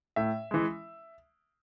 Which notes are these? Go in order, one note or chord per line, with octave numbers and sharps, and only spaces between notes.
A2 E5
E3 G#3